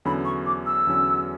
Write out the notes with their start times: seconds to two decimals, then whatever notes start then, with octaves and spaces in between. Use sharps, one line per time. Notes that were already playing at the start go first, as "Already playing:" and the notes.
0.05 E2 D3 F#3 C#4 B5
0.25 C#6
0.46 D6
0.66 E6
0.87 E2 D3 F#3 C#4